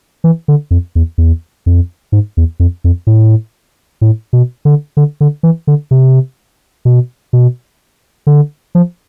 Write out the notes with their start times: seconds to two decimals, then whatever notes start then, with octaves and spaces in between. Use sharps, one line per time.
0.24 E3
0.48 D3
0.71 F2
0.95 E2
1.18 E2
1.66 F2
2.12 G#2
2.37 E2
2.60 F2
2.84 F2
3.07 A2
4.01 A2
4.33 B2
4.65 D3
4.97 D3
5.21 D3
5.43 E3
5.67 D3
5.91 C3
6.85 B2
7.33 B2
8.27 D3
8.75 F3